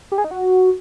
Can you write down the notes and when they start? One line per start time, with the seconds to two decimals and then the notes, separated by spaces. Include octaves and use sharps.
0.12 G4
0.18 G#4
0.24 D#4
0.31 F#4